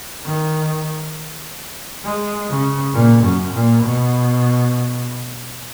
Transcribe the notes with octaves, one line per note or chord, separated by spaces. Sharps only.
D#3
G#3
C#3
A#2
F#2
A#2
B2